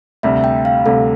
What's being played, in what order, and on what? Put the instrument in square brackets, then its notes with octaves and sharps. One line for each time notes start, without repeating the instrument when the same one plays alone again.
[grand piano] D2 C3 G3 [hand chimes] E5
[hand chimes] G5
F5
[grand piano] D2 C3 G3 [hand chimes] A4